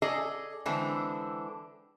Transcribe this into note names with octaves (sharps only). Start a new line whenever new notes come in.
G#4 A4 D5 D#5 G#5
D3 E3 G#3 C4 D4